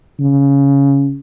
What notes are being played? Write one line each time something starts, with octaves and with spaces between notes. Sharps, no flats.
C#3